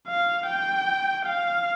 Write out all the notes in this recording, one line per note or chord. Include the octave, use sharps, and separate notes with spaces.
F5
G5
F5